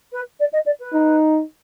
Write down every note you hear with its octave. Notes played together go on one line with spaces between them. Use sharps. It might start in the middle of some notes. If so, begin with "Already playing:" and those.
B4
D5
D#5
D5
B4
D#4